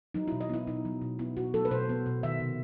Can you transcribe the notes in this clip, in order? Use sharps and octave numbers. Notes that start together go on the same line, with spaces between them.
F#3 D#4
B2 E4
D#5
B3 E4
B2 D#4
F#3
B2
B3 E4
B2 F#4
F#3 A4
B4
B2 C5
B3
B2
D#3 E5
C3